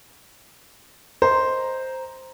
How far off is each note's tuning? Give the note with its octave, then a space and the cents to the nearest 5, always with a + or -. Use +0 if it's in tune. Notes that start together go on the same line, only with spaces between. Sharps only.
C5 +0 D#5 +0 A#5 +5